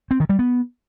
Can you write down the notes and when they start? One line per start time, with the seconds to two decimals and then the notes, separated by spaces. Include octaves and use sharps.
0.11 C4
0.20 D#3
0.29 G3
0.39 B3